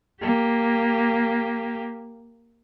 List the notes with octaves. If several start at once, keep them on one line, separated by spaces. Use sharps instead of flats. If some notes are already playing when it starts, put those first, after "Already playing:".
A#3 G4